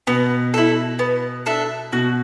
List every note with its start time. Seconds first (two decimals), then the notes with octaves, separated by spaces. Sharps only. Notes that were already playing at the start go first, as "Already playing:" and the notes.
0.07 B2 B3
0.54 E4 A4
0.99 B3
1.46 D4 A4 E5
1.92 B2 F#4